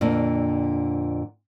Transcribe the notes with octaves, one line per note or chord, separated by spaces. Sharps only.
F2 A#2 D3 D4